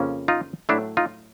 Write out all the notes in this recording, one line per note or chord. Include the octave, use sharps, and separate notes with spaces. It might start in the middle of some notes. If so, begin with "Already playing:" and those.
Already playing: F2 C#3 F3 A#3 C#4
D#4 F4
A2 F#3 A3 D4 E4
D#4 F4